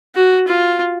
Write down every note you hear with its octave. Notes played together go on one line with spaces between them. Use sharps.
F#4
F4